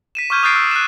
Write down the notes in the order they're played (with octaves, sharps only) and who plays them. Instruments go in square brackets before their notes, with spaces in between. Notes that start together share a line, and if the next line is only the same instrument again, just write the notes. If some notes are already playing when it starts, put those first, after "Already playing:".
[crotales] B6 D#7 E7
C#6 D6 F6 G6 G#6 D#7
D#6 F#6 G6 A6 C7 D7
E6
F#6 E7